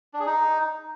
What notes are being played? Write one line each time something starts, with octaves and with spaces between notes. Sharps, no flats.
D4
G#4
D#4